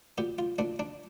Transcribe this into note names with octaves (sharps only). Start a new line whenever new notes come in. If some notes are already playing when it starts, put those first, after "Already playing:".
A#2 G4
F4
A#2 D4
D4